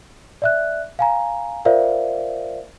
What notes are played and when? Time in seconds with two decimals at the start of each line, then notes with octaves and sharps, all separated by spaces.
0.42 D5 E5 F#6
0.99 F5 G#5 A#5
1.65 F4 A#4 C5 D5 E5 F5